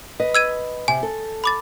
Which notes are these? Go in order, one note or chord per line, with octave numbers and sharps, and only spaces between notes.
B4 D#5
E6 G#6 D#7
C3 G#5
A4
B5 D6 A6